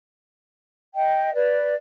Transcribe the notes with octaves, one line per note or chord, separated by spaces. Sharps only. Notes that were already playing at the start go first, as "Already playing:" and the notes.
D#5 G5
B4 D5